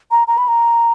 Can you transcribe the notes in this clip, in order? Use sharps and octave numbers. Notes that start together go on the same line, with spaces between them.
A#5
A#5
B5
A#5